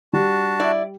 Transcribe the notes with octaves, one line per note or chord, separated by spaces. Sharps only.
G3 D4 F#4 A5
E4 D5